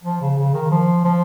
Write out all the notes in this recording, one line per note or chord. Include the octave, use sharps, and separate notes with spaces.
F3
C#3
C#3
D#3
F3
F3